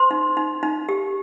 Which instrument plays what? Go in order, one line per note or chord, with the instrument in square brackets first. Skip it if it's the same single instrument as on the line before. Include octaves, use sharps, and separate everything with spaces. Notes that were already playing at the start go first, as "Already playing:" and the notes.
Already playing: [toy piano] C5 C6
D#4
D#4
D#4
G4